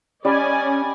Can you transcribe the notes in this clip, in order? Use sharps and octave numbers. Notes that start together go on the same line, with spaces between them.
G3 C#4 D5 D#5 G#5